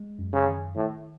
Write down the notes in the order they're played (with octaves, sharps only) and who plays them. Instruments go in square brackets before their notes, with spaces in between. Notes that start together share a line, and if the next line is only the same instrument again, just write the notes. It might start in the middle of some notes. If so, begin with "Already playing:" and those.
Already playing: [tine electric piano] G#3
F#2
[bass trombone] C#3
[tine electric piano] D#3
[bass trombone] A2 [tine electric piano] D#3